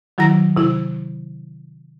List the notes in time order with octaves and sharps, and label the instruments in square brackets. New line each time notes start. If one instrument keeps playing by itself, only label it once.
[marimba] D#3 F#3 E4 A#5 A#6
C3 E4